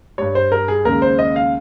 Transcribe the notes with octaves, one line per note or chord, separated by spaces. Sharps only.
G2 G3 C#5
C5
A#4
G#4
D#2 C#3 G#3 A#4
C5
D#5
F5